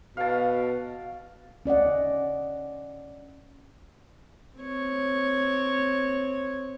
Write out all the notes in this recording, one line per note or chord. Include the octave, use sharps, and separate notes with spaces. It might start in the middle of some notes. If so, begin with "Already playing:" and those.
B2 F5 A5
C#4 D5 D#5 F#5
C4 C#5